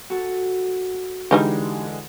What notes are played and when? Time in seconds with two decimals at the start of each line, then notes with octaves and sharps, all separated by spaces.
0.10 F#4 A4
1.31 D3 E3 G3 G#3 D#4 G4